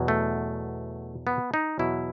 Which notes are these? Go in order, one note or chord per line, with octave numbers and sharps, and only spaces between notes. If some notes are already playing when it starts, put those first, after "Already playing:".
Already playing: E2 B2 F#3
A3
B3
D#4
E2 B2 F#3 E4